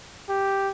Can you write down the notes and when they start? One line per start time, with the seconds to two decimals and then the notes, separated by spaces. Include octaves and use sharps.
0.29 G4